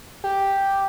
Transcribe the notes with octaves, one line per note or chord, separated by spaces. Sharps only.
G4